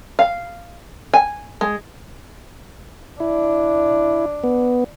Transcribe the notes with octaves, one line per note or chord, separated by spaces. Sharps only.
F5
G#5
G#3
D4 E4
B3